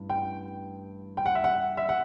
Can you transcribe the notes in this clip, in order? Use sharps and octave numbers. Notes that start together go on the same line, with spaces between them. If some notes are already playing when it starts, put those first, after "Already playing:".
Already playing: A1 G2
G5
G5
F#5
E5
F#5
E5
F#5